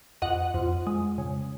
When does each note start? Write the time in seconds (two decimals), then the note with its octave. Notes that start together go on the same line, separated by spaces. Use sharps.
0.22 F2 D#5 F#5
0.54 F2
0.87 G#3
1.18 C#3